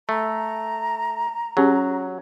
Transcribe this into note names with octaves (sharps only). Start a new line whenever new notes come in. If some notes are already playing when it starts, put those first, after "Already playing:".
A3 A#5
F#3 C#4 G4 G#4